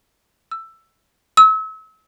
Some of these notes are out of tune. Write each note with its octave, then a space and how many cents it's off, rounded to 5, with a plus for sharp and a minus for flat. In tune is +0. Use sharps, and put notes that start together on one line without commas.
E6 +10
E6 -35